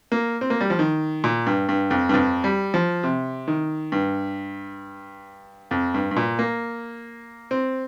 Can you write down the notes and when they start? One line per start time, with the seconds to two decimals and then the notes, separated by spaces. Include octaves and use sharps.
0.12 A#3
0.41 C4
0.50 A#3
0.61 G3
0.70 F3
0.79 D#3
1.24 A#2
1.47 G2
1.69 G2
1.90 F2
2.09 G2
2.14 F2
2.44 G3
2.74 F3
3.03 C3
3.48 D#3
3.92 G2
5.71 F2
5.94 G2
6.11 G2
6.17 A#2
6.39 A#3
7.51 C4